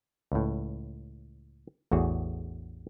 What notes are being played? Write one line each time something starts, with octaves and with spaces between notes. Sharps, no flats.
C#2 A2
A1 E2 F#4 G#4